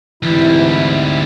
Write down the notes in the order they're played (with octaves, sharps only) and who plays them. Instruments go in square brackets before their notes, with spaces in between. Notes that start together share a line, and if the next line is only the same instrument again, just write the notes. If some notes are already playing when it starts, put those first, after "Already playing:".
[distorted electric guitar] D2 G3 [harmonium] G#2 C3 E4 [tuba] E3